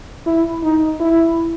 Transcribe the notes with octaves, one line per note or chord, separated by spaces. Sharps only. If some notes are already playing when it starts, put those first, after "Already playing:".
E4
D#4
E4